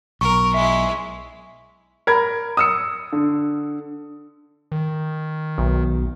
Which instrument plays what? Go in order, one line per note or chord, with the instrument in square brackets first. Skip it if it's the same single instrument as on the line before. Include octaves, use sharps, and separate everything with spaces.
[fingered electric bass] B1 [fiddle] A#4 [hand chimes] C#6
[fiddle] G#3 E4 [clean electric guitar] E5
[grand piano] A#4 B5 G#6
D#6 E6 C#7
D3
[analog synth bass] D#3
[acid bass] B1